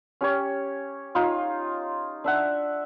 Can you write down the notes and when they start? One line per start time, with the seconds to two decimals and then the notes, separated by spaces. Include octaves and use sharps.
0.21 C#4 G4 C#5
1.15 D#4 F4
2.24 D4 E5 F#5